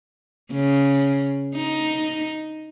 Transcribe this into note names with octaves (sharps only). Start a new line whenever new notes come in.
C#3
D#4